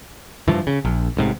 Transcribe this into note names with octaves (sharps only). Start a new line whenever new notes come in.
G2 E3 F3
C#3
A#1
A1 G#2 C3